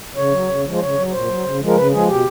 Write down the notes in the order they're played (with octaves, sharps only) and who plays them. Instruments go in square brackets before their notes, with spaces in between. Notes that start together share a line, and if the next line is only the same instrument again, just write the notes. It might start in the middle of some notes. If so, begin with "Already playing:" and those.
[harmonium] C#3 C#5
F#3
C#3
F3 G#3
C5
C#3 C#5
F#3
A#2 C5
F#3
C#3
F3 G#3
A#4
C#3 B4
F3 G#3 G#4
B2 G4